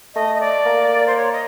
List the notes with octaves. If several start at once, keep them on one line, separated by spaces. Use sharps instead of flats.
A3 D#5
D#5
D5
A#3
C5
C#5
D#5